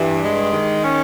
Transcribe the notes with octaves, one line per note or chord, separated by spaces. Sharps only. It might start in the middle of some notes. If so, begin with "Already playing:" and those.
Already playing: G2 E3
G#3
D#3
C#4